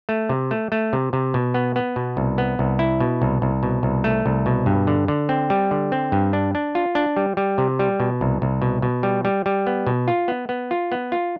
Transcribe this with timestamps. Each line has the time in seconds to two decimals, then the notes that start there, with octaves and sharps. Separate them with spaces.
0.09 A3
0.29 C3
0.51 A3
0.72 A3
0.93 C3
1.13 C3
1.34 B2
1.54 B3
1.76 B3
1.96 B2
2.17 C2
2.38 B3
2.59 C2
2.79 E4
3.00 B2
3.22 C2
3.42 C2
3.63 B2
3.83 C2
4.04 A3
4.26 C2
4.46 B2
4.66 G2
4.87 D3
5.08 D3
5.29 C4
5.50 G3
5.71 D3
5.92 C4
6.12 G2
6.33 D4
6.55 D4
6.75 F4
6.95 D4
7.17 G3
7.37 G3
7.58 C3
7.79 G3
8.00 B2
8.21 C2
8.42 C2
8.62 B2
8.82 B2
9.03 G3
9.25 G3
9.46 G3
9.67 B3
9.87 B2
10.08 F4
10.28 B3
10.49 B3
10.71 F4
10.92 B3
11.12 F4